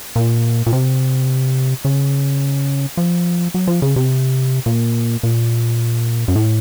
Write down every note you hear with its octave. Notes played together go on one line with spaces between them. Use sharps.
A#2
A#2
C3
C#3
F3
F#3
F3
C#3
C3
A#2
A#2
F#2
A2